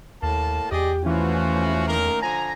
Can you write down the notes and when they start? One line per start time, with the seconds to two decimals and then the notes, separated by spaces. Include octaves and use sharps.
0.23 D#2 A2 A#3 A5
0.72 E2 G4 G#4 D5 D#5
1.06 E3 F3 A3 C#4 F4 F#4
1.88 D#3 A#3 A#4
2.22 D3 F3 G#5 A#5